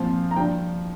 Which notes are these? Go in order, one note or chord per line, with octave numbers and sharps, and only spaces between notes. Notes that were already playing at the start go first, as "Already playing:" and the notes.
Already playing: A#2 F3 C4 F5
A#5
G2 F3 D4 G5